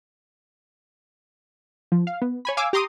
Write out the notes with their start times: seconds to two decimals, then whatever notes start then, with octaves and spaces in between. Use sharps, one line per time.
1.92 F3
2.07 F5
2.22 B3
2.45 C#5 G#5 B5
2.57 F5 G#5 D6 E6
2.73 G4 A#5 C6 D6 D#6